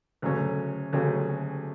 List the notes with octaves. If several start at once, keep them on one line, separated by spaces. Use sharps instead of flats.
D2 C#3 F#3 A3 C#4
D2 C#3 F#3 A3 C#4